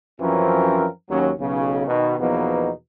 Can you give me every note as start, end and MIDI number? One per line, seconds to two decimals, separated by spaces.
0.20 0.86 42
0.20 0.86 52
0.20 0.86 53
0.20 0.86 60
0.20 0.86 61
0.20 0.86 70
1.10 1.31 39
1.10 1.31 54
1.10 1.31 61
1.40 1.86 35
1.40 1.86 49
1.87 2.15 47
1.87 2.15 51
2.19 2.70 40
2.19 2.70 47
2.19 2.70 53
2.19 2.70 58
2.19 2.70 59
2.19 2.70 63